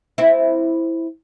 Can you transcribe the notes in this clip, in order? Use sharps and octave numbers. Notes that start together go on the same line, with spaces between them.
C4 E4